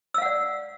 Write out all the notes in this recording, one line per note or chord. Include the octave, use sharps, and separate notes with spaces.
D5 F5 F#5 E6